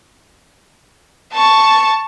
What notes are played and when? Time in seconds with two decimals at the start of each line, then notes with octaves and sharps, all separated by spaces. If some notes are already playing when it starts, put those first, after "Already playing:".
1.33 A5 C#6